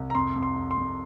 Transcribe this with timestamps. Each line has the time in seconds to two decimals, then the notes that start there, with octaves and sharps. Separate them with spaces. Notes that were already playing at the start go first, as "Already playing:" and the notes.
Already playing: C2
0.10 A#5
0.15 F2 C6
0.36 F2
0.43 C6
0.56 F2
0.71 C6
0.78 F2